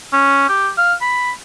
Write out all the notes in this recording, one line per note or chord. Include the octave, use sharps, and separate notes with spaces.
C#4
G4
F5
B5